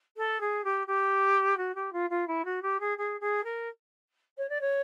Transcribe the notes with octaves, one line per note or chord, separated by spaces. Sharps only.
A4
G#4
G4
G4
F#4
G4
F4
F4
E4
F#4
G4
G#4
G#4
G#4
A#4
C#5
D5
C#5